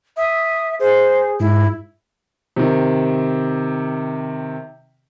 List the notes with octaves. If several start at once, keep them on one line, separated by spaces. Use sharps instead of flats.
E5 D#6
G#4 C5
G#2 E4
C3 D#3